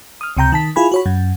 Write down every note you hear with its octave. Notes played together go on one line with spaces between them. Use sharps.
D#6 F6
C#2 C3 G5 A#5 G6
D#3 A5 B6
E4 F4 G#4 G#5 B5
F#4 C#5 B5
F#2